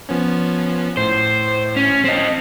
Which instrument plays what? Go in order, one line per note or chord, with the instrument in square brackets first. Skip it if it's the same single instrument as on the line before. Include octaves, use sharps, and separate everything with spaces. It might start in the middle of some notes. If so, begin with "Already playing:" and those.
[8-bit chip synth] F3 B3 C#4
[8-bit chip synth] A2 [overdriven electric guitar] C5
[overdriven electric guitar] C#4
C4 D#5